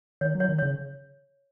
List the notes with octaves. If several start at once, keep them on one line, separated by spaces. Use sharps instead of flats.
D#3 C#5
F#3
C#5
D#3
C#3 C#5